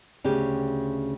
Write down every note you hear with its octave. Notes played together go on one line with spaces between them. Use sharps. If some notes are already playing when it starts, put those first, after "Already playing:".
D2 C#3 G4